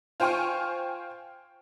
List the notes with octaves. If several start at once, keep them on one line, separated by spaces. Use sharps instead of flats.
F4 C5 G5 G#5 C#6 F6